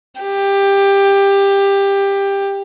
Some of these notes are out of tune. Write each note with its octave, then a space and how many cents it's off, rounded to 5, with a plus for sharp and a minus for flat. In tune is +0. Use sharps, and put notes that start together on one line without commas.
G4 +15